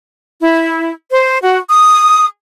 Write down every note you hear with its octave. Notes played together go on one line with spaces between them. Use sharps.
E4
C5
F#4
D#6